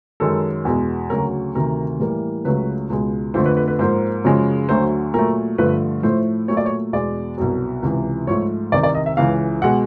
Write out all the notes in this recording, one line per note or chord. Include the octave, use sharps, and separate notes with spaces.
F#2 D#3 G#3 A4
E2 B2 G#3
D2 C#3 F#3 A#4
D2 C3 D#3 A#4
A2 E3 G3 A#3
C#2 C#3 F#3 A3 B4
C#2 B2 G#3
F2 D3 F3 A3 C5
B4
B4
B4
G#2 F3 A#3 C5
F#2 C#3 F3 G#3
D2 D3 F#3 A3 C5
A#2 F#3 A3 A#4
G2 D3 F3 A3 B4
A2 F3 A3 C5
A#2 F#3 A3 C#5
D5
C#5
E2 B2 G#3 D5
C2 B2 F#3
C#2 C3 E3
G#2 F3 A3 C#5
C2 C3 D#3 D5
D5
D#5
E5
C#2 C#3 E3 F5
B2 G#3 F#5